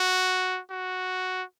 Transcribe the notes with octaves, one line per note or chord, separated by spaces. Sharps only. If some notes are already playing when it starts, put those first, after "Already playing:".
Already playing: F#4
F#4